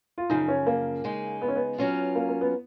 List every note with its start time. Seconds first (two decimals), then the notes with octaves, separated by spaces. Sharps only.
0.18 F4
0.30 F#2 C#3 F3 D#4
0.48 C#4
0.67 A#3
1.04 C#3 G#3 D#4
1.42 B3
1.48 C#4
1.56 B3
1.78 F#3 C#4 F4
2.15 A#3
2.29 A#3
2.41 B3